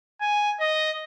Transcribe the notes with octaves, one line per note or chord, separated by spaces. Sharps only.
G#5
D#5